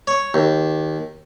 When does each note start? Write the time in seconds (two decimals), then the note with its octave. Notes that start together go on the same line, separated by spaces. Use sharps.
0.07 C#5
0.34 D#2